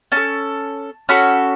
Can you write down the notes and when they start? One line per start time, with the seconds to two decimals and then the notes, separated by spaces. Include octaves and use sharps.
0.12 C#4 A4 A5
1.09 C#4 F#4 A4 B5